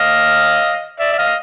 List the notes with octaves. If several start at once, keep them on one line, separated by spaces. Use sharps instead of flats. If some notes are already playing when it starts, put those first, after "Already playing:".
Already playing: D#5 F5
D5 E5
E5
D#5 F5